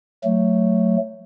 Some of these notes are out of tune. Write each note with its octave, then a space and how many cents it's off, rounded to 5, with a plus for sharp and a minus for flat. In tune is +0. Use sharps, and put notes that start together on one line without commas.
F#3 +0 A3 +15